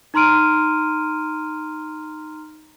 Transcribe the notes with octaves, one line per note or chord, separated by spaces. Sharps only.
D#4 A#5 C6 F6 D7 D#7